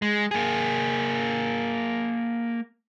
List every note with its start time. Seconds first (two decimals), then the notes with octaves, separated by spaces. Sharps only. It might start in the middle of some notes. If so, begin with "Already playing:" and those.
0.02 G#3
0.31 A#3 G#4